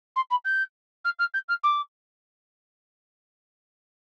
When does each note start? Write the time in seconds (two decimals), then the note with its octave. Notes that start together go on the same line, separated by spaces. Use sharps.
0.16 C6
0.31 B5
0.45 G6
1.05 F6
1.19 F6
1.34 G6
1.49 F6
1.64 D6